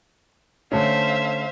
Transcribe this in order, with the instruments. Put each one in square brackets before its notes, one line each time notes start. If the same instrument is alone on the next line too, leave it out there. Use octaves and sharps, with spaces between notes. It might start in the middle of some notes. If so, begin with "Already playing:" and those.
[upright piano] D3 A3 C#4 [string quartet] C5 E5 F5